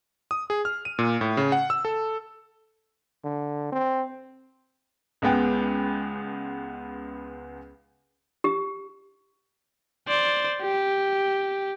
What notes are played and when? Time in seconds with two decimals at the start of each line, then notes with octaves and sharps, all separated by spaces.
0.31 D#6
0.50 G#4
0.65 F6
0.85 D#7
0.99 A#2
1.21 A2
1.37 C#3
1.52 F#5
1.70 E6
1.85 A4
3.24 D3
3.72 C4
5.22 C#2 G#3 B3 G5
8.44 G4
10.08 C5 D5
10.61 G4